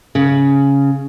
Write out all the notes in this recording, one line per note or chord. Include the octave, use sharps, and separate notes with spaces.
C#3